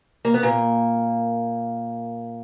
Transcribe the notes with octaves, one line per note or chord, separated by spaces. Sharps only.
A#3
B3
A#2 A#3